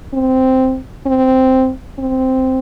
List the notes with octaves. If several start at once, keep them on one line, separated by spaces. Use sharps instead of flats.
C4
C4
C4